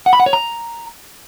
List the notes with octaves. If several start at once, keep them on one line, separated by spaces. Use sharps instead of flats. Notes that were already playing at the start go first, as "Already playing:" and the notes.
F#5
B5
F#5
C#5
A#5